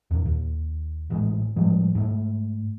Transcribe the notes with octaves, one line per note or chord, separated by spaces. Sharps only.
E2 A#2
D#2
A1 A2 G#3
A2 F3 G3 G#3
G#2 G#3 A3